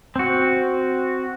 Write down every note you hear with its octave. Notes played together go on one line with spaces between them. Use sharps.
C4 F#4